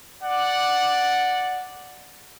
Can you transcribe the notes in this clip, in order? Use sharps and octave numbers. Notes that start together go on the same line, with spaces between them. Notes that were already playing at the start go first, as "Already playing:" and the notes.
D5 F#5